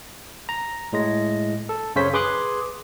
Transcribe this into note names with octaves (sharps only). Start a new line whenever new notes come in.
A#5
A2 G#3 A#6
A4
F#2 C#3 C#4 C5 C#5 B6
G#4 B4 C6 D6 D#6 F#6